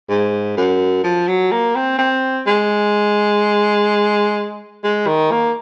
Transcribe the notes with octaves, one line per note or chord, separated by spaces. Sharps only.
G#2
F#2
F3
F#3
A#3
C4
C4
G#3
G#3
D#3
A#3